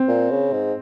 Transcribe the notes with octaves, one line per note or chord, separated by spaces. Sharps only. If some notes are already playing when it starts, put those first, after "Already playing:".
Already playing: C4
A#2
C#3
G#2